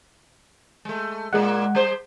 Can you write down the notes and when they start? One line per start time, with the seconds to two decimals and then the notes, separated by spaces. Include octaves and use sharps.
0.85 G#3 A3
1.33 A#2 G#3 A#3 F#5
1.75 G3 G#4 C5